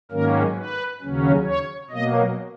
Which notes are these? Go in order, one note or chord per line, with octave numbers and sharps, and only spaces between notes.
G#2 D#3 F#3 A#3 C#4 A#4
B4
D#2 C#3 F#3 C#4
C#5
B2 F#3 A#3 D#5